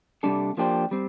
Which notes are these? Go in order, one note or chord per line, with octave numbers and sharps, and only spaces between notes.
C3 G3 D4 A4
F3 A#3 D4 G4 C5
G3 C4